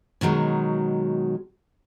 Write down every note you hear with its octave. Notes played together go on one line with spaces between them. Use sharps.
B2 D#3 F#3 G#3